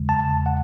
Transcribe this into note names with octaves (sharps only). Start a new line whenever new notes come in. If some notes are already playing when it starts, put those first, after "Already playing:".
Already playing: E2 C#3 G#3
A5
F#5